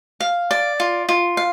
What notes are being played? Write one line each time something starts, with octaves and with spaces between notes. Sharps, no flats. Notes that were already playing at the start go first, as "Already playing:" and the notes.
F5
D5
F4
F4
F5